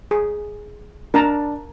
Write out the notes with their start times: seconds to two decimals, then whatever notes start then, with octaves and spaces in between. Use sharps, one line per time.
0.11 G#4
1.14 D4 A#4 A5 A#5